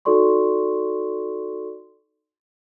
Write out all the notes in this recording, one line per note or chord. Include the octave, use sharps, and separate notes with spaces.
D#4 F#4 A4 D5 C6 C#6